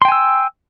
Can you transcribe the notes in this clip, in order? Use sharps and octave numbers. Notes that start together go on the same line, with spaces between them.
G5 G#5 C6 E6